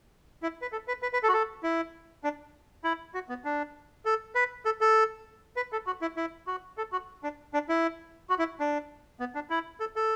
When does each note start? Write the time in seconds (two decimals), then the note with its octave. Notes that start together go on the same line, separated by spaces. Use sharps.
0.43 E4
0.62 B4
0.72 A4
0.88 B4
1.02 B4
1.13 B4
1.23 A4
1.28 F#4
1.34 A4
1.63 E4
2.24 D4
2.84 E4
3.14 F#4
3.29 B3
3.44 D4
4.05 A4
4.35 B4
4.65 A4
4.81 A4
5.56 B4
5.72 A4
5.87 F#4
6.02 E4
6.17 E4
6.47 F#4
6.78 A4
6.92 F#4
7.24 D4
7.54 D4
7.69 E4
8.30 F#4
8.39 E4
8.60 D4
9.20 B3
9.35 D4
9.50 E4
9.80 A4
9.96 A4